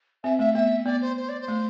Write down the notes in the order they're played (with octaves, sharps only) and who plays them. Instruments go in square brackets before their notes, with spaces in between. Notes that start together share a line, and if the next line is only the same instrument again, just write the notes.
[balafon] C4 [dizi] E5
[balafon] A3 [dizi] E5
[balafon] B3 [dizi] E5
[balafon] B3 [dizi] D5
[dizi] C5
C5
D5
C5
[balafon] A3